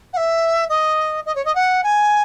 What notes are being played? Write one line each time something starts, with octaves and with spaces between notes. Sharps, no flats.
F#5
E5
D#5
D#5
C#5
D#5
F#5
G#5